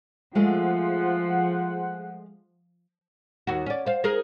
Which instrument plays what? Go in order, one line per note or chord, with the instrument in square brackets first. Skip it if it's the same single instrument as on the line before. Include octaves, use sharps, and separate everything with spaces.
[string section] F3 [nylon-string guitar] G#3 A3 [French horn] F4 [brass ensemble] G#4 C5 F#5
[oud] D#2 F#4
C#4 D5
C5 F5
D#4 G#4 A#4